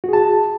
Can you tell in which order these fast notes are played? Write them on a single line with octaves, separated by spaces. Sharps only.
F#4 G#4 A5